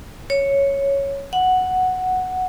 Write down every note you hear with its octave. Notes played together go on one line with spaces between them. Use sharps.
C#5
F#5